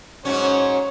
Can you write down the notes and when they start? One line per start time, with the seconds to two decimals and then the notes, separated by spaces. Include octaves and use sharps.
0.25 G#2 F#3 C#4 C#5